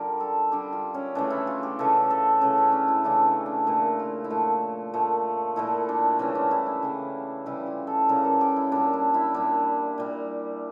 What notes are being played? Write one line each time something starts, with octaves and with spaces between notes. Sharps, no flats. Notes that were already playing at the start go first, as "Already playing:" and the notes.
Already playing: D3 G3 F4 G4 A#4
A4
D3 G3 G4
F4
C#4
C#3 E3 A3 D4
E4
F4
G4
C#3 E3 A3 A4
A4
C#3 E3 A3 A4
C#4
D4
E4
C#3 E3 A3 D4
C#4
D4
A#2 F3 A3 E4
F4
E4
A#2 F3 A3 F4
A#2 F3 A3
A#2 F3 A3 E4
D4
C#3 E3 G3 C#4
D4
E4
D4
C#3 E3 G3
C#3 E3 G3 E4
F4
A4
C#3 E3 G3 A#4
A4
G4
E4
A#2 G3 D4
D4
E4
A#2 G3 D4
A#2 G3